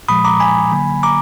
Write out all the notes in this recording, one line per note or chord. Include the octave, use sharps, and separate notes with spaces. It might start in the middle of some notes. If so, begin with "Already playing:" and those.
A#2 F3 G#3 B5 D#6
A#5 D6
G#5 B5
D3 F#3 A#3
A#5 D6